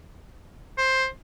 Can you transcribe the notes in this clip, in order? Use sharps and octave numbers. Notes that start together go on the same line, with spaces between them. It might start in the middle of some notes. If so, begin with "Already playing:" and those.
C5